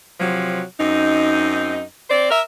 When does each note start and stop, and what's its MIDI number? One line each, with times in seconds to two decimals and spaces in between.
0.20 0.63 48
0.20 0.63 53
0.20 0.63 54
0.79 1.81 42
0.79 1.81 60
0.79 1.81 63
2.10 2.30 60
2.10 2.30 72
2.10 2.30 74
2.31 2.40 70
2.31 2.40 76